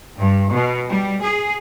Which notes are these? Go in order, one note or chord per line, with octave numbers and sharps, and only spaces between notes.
G2
B2
G3
G#4